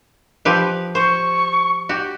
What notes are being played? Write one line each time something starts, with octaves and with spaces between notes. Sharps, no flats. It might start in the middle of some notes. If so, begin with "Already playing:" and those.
F3 G4 B4
C5 C#6
F#4 G4